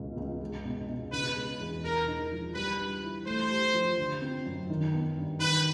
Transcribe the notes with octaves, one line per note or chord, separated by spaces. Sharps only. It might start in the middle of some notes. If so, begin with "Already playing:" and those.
Already playing: C#2 B2
C#2
G#3
B2
B2
C#3 B4
G#3
E2
G#3 A#4
D#4
F3
G3 B4
D4
E3
A3 C5
G4
F3
D3
C4
F#2
D#3
B3
G2
D#3 B4